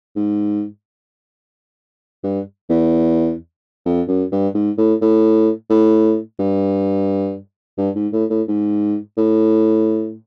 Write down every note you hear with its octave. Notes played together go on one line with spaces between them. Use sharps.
G#2
G2
E2
F2
F#2
G2
G#2
A2
A2
A2
G2
G2
G#2
A2
A2
G#2
A2